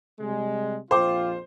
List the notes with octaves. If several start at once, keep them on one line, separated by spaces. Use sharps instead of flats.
C3 G3 G#3
A#1 F2 F4 C5 G5 D6